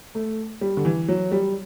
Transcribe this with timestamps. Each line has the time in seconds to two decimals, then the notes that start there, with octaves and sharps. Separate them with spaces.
0.15 A3
0.61 G3
0.77 D3
0.85 E3
1.08 F#3
1.32 G3